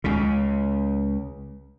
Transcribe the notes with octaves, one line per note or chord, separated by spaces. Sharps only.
C#2 C#3